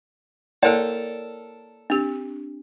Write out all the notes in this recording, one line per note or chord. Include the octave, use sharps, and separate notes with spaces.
A#3 E4 A4 A#4 C#5 D5 G5 A5
C4 D4 G4